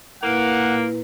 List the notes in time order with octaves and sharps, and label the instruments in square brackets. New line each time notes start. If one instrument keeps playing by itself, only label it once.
[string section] A#2 [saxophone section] A#3 [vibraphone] E4 B4 [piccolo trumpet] F#5